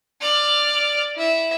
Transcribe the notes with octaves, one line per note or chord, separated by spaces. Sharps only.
D5 F6
E4 E5